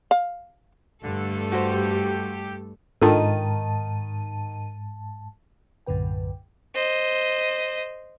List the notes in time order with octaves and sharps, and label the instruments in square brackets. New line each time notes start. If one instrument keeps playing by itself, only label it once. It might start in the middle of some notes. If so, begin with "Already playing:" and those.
[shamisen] F5
[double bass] G2 [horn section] D3 [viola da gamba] G3 A3 A4
[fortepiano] F#4 C5 [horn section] G4
[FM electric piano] G#2 A5 [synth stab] D#3 D#7 [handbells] D4 F4 A4
[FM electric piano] B1 F#2 A2 D3 B4 G5
[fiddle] C5 D#5